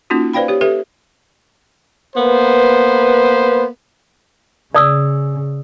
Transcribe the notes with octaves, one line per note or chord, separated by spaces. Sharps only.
A#3 C#4 D#4 F4 F#4
B4 C5 D5 F5 G5 B5
G4 C#5
G4 A4 B4 E5
A#3 B3 B4 C5
C#3 D5 D#6 E6